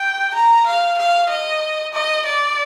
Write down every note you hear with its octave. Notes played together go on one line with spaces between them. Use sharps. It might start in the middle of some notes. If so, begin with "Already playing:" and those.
Already playing: G5
A#5
F5
F5
D#5
D#5
D5